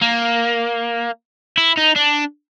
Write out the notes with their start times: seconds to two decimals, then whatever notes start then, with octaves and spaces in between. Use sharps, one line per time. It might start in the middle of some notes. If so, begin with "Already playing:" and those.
0.02 A#3
1.58 E4
1.78 D#4
1.96 D4